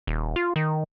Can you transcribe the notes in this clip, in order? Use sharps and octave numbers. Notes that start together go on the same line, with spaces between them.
D#1
F4
D#3